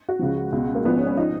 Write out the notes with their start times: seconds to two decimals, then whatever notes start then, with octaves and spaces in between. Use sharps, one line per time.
0.09 F#4
0.19 C#2 C#3 F3
0.52 C#2 B2
0.75 A#3
0.85 A#1 G#2 F3 B3
0.96 C#4
1.07 C#4
1.17 F3 D#4